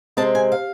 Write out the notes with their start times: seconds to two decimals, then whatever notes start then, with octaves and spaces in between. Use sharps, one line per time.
0.17 C3 G#3 C4 A5
0.35 G#5
0.52 F5